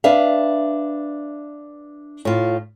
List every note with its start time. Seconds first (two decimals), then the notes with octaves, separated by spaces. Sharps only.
0.04 D4 B4 E5 F5
2.25 A2 F4